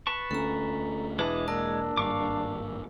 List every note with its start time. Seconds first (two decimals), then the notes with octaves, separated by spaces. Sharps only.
0.07 B4 A5 C#6
0.31 D2 C4 C#4 A4 A#5
1.19 E1 E3 G#3 D4 A5 D#6
1.48 A#3 D4 A#4 E6
1.97 G#1 G2 F5 C#6 D6